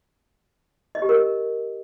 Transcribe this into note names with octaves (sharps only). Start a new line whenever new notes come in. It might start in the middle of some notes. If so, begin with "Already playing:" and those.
D#5
G4
A#4